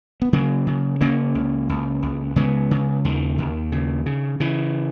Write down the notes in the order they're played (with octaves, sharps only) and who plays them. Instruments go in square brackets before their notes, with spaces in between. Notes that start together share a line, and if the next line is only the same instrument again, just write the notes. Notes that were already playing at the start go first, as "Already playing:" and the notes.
[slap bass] B3
C#3 F#3 A#3
C#3
C#3 A#3 C#4
C#2
C#2
C#2
C#3 G#3 B3
C#3
D#2 D#3
D#2
C#3
C#3
C#3 E3